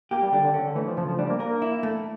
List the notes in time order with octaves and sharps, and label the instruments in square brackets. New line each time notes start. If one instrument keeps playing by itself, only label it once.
[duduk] A#3 [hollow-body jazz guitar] G4
[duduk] G3
[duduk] D3 [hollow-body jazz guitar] D4
[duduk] D3
[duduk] D3 [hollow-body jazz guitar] C#4
[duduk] D3
[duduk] E3 [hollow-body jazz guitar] A3
[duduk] F3
[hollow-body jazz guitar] C#3 [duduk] F3
[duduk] F3
[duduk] G3 [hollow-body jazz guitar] D4
[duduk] A#3
[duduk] A#3 [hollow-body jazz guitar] A#4
[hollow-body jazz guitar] E4
A3